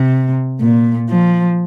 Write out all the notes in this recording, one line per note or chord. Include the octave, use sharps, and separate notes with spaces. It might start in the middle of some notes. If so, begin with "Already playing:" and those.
Already playing: C3
A#2
F3